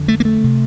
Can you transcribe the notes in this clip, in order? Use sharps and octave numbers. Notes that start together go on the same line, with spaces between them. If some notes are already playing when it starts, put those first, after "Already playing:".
Already playing: F2 D3
A3
A#3
A3
C3